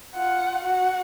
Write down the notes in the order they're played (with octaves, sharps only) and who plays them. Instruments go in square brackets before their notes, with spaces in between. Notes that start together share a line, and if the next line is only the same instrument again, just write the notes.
[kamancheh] F4 [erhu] F#5
[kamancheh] F#4 [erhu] F#5